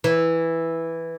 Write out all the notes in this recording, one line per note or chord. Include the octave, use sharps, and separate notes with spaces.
E3